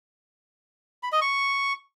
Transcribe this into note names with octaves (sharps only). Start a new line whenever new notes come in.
B5
D#5
C#6